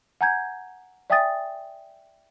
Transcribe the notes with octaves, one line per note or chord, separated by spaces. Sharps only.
F#5 G#5 A#5 G6 G#6
D5 E5 G5 G#5 D#6 A6